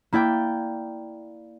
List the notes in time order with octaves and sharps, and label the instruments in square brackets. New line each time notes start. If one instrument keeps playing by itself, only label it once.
[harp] A#3 E4 D5 G5